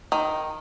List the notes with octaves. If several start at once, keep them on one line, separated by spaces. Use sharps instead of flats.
D#3